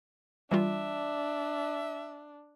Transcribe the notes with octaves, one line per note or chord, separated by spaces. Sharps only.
E3 G3 D4 F4 E5